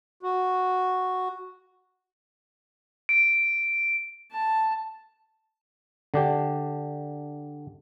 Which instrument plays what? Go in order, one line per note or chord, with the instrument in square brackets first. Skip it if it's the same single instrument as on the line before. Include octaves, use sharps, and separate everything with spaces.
[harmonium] F#4
[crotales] D7
[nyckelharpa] A5
[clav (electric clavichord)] D3 D4 G4